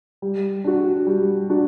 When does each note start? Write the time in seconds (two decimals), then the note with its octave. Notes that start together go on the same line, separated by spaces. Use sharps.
0.22 G3
0.64 D4 F#4
1.07 G3
1.50 D4 F#4